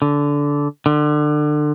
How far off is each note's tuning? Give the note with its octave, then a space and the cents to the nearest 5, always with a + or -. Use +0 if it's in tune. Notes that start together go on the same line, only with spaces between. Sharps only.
D3 -15
D3 +30